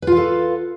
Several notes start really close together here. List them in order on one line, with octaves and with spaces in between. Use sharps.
B4 F4 F5 A4